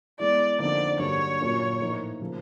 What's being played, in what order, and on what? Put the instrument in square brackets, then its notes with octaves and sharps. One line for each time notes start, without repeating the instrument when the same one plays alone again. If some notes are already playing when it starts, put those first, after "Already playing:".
[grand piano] E3 G#3 B3 [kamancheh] D5
[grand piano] F2 D3 F3 A#3 D#4 [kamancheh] D5
[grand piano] G2 D3 F#3 A#3 D4 [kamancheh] C#5
[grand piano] A#2 F#3 A#3 C#4 F4
A2 F3 A#3 D#4
C#3 F3 A#3